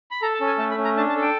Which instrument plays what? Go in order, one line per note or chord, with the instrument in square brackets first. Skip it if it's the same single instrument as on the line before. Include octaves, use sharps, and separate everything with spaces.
[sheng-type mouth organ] B5
A4 A#5
A5
C#4
G#5
A3 A5
B5
C#4
A#5
D4 A5
A5
A4
G5